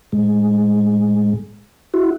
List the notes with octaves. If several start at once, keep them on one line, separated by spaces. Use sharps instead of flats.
A2 G#3
E4 F#4